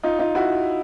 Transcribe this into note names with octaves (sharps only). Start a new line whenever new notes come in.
D#4 F4
D#4 F4
E4 F#4